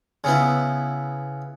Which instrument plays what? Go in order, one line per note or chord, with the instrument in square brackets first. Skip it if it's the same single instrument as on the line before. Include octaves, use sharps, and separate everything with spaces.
[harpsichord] C#3 B3 E4